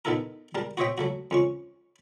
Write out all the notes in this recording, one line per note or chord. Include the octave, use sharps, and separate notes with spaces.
B3 D#4 E4 A4 A#4
G3 A#4 A5
F#4 C5 C#5 D#5 E5 G5
F#3 A3 F#4
F2 C#4 C#6